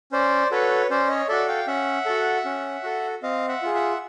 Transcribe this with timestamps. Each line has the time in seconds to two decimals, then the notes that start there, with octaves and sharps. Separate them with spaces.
0.12 C#4 C5 D5
0.51 F#4 A4 B4 C#5
0.90 C#4 C5 D5
1.09 C#5 D#5
1.29 F#4 A4 D5 E5
1.48 F5 G5
1.67 C#4 E5 F#5
2.06 F#4 A4
2.45 C#4
2.84 F#4 A4
3.23 C4 D#5 F5
3.48 E5 F#5
3.62 F4 G#4
3.74 E5 F#5